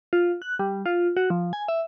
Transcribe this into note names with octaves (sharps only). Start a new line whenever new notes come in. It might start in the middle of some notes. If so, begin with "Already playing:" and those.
F4
F#6
G3
F4
F#4
F3
G#5
E5